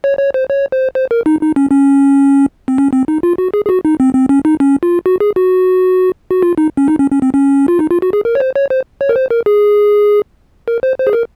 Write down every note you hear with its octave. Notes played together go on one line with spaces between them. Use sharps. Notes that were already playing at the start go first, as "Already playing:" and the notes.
C#5
C#5
C5
C#5
C5
C5
A#4
D#4
D#4
C#4
C#4
C4
C#4
C4
D#4
F4
F#4
G#4
G#4
F#4
D#4
C4
C4
C#4
D#4
C#4
F4
F#4
G#4
F#4
F#4
F4
D#4
C#4
D#4
C#4
C#4
C4
C#4
F4
D#4
F4
F#4
G#4
A#4
C#5
C5
C#5
C5
C#5
A#4
C5
A#4
G#4
A#4
C5
C5
G#4
A#4